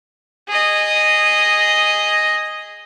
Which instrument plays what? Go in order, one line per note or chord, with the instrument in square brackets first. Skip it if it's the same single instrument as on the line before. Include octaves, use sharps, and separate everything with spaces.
[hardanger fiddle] G#4 D#5